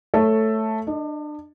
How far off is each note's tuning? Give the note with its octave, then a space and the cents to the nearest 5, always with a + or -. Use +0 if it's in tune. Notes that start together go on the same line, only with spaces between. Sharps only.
A3 +0 A4 +5 C#5 +0
D4 +30 D#5 +0